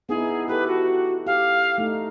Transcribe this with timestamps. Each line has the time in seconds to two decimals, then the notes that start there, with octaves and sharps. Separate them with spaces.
0.09 B3 D#4 E4 G#4
0.48 E4 G4 A4 B4
0.67 F#4
1.27 G4 F5
1.78 A3 D#4